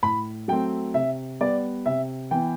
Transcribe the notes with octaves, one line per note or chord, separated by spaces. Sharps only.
A2 B5
F#3 A3 C4 G5
C3 E5
G3 B3 D5
C3 E5
E3 B3 G5